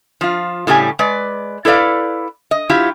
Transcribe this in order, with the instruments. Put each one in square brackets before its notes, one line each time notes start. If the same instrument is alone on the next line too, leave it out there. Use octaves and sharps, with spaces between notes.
[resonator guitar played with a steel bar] F3 F4
A2 C#3 G3 G4 G#5
G#3 B4 D5
E4 A4 B4 D5 F5
D#5
F#3 E4 F4 G4